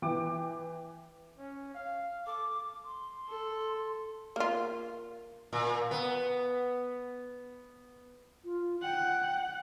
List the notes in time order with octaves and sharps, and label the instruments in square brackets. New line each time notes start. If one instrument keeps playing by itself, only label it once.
[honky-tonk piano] E3 G5 D6
[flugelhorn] C#4
F5
[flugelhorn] A4 [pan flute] D6
[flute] C6
[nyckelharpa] A4
[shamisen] A#3 F4
[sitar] A#2
B3
[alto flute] F4
[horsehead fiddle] F#5 [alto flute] G5